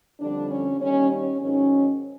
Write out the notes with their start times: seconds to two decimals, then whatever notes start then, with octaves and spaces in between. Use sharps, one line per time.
0.20 F2 D3 G3 D4
0.50 C#4
0.81 D#2 D#3 G3 C#4
1.11 C#4
1.41 G#2 D#3 F#3 C#4